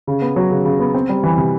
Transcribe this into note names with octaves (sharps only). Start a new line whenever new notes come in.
C#3
B3
F#3
C#3
C#3
B3
C4
G3
E3
C3